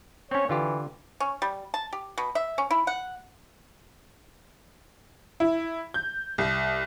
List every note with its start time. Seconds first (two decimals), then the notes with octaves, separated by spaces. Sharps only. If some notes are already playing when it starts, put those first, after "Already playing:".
0.31 C4 C#4 C#5
0.49 D3 E3 F4 G4
1.20 C#4
1.42 G3
1.74 A5
1.93 G4
2.18 B2
2.35 E5
2.58 C#4
2.71 E4
2.87 F#5
5.40 E4
5.94 G6
6.38 C2